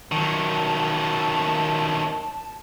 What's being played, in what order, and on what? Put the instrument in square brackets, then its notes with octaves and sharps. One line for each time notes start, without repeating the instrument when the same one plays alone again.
[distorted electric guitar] D#3 F#3 [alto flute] A5